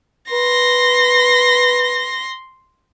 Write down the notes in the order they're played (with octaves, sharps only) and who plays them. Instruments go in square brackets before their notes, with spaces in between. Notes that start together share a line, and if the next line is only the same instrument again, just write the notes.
[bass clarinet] B4 [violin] C6 A#6